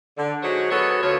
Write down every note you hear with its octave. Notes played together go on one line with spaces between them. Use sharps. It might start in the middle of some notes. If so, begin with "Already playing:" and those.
D3
F#3 G#3 D#4 C5 C#5
B3 F#4 G#4 A4 B4 C#5
D2 D3 B3 F4 C5 C#5